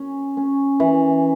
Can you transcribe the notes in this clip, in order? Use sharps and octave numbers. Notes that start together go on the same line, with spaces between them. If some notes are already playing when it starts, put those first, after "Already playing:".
Already playing: C#4
C#4
E3